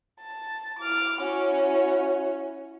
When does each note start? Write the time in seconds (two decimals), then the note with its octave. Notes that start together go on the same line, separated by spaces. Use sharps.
0.21 A5
0.79 E4 D6 F6
1.22 C#4 F#4